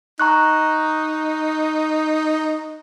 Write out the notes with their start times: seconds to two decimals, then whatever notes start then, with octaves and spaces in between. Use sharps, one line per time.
0.20 D#4 A#5 C#6 F#6